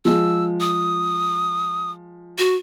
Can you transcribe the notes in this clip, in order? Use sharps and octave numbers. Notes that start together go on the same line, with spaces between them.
F3 G#3 E6
D#6
F#4